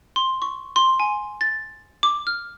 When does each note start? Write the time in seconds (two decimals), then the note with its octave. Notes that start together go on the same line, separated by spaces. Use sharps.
0.16 C6
0.42 C#6
0.76 C6
1.00 G#5
1.41 A6
2.03 D6
2.27 F6